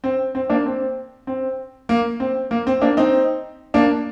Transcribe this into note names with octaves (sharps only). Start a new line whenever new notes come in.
C4
C4
A#3 D4
C4
C4
A#3
C4
A#3
C4
A#3 D4
C4 D#4
A#3 D4